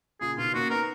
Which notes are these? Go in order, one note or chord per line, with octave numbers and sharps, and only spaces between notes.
A#2 C#3 G#4
B2 D#3 F4
A#3 C#4 F#4
B3 D#4 A#4